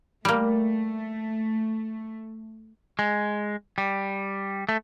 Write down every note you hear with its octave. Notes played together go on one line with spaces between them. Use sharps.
G3 A3 A#3
G#3
G3
A3